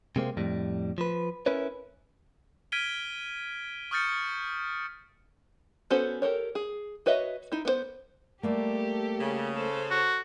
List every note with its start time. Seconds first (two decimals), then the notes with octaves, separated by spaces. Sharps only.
0.16 C3 G#3 A#3 C4
0.37 F2 A2 G3
0.98 F3 B4
1.46 C#4 E4 A#4 B4 C#5
2.72 F6 G#6 B6 D7 D#7 G7
3.91 C#6 D#6 F6 G6 A6 C#7
5.90 B3 C#4 F#4 A4 C5
6.22 G4 A4 A#4 C#5
6.55 G#4
7.06 F#4 B4 C#5 D#5 E5
7.52 D#4 E4
7.65 B3 D4 C5
8.43 G3 A3 A#3 G4 A4
9.19 C#3
9.53 A4 C5
9.91 F#4